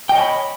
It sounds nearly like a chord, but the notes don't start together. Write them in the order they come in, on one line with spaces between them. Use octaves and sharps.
G5 D#5 C#5 G#5 B5